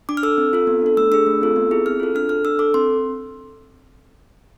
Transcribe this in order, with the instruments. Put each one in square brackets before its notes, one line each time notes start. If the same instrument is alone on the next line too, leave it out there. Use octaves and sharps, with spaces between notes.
[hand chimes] D4 D6
F6
A4 E6
C4
F4 A4
B3
D4 A4
A3 E6
D4 G#4 E6
A3
C4 F4 A4
B3
E4 G#4
C4 F6
F4 A4
D4 F6
A4 F6
D4 E6
A4 D6
C4 C6